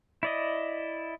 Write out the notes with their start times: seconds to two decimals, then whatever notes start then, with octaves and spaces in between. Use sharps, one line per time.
0.23 E4 D5 D#5